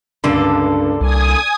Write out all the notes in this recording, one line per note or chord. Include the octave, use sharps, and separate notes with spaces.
C#2 G2 D3 A#3 A4
C2 D5 G#5 D#6